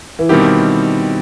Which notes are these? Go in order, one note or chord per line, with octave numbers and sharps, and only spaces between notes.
E3
B2 D#3 G3 C4 E4 G4